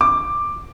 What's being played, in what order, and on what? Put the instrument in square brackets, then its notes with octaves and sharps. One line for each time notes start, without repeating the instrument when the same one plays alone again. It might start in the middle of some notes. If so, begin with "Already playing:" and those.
[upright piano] D6